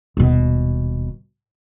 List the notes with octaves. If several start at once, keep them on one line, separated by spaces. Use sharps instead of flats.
D#1 B2